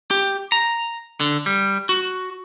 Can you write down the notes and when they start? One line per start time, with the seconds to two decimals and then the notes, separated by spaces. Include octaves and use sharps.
0.11 G4
0.52 A#5
1.20 D3
1.46 G3
1.89 F#4